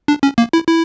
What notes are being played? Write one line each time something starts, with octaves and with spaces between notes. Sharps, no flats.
D4
C#4
A#3
E4
E4